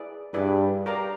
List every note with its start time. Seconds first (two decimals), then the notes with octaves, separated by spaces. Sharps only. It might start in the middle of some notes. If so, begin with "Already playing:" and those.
Already playing: E4 G#4 B4 D5
0.34 G2 E4 G#4 B4 D5
0.86 G4 A#4 D5 F5 A#5